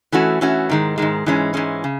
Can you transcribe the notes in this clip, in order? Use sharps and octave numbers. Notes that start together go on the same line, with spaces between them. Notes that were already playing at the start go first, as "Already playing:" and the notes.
E3 A3 C#4 F#4
E3 A3 C#4 F#4
G#2 D#3 G#3
G#2 D#3 G#3
G#2 E3 G#3 C#4
G#2 E3 G#3 C#4
C#3